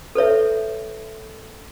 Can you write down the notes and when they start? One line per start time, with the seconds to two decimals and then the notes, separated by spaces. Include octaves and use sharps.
0.15 A4 B4 C#5 E5